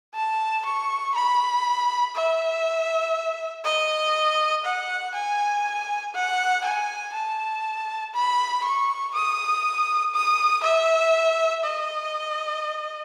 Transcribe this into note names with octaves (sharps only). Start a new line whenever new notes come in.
A5
C#6
B5
E5
D#5
F#5
G#5
F#5
G#5
A5
B5
C#6
D#6
D#6
E5
D#5